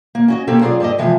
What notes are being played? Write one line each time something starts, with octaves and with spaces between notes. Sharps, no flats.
A#3
C#4 F#4 D#5
A#3 C4 C#4 G4 A4
F#3 F4 G#4 B4 D5 F5
G2 A4 D5 D#5
C3 E3 F3 G#3 B3